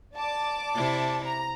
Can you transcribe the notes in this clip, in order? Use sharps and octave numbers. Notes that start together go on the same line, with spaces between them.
D5 A5 D6
C3 E4
A#5